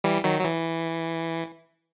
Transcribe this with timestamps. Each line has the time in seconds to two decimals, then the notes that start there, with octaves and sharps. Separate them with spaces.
0.04 E3 G3
0.24 D#3 F#3
0.39 F#3
0.45 E3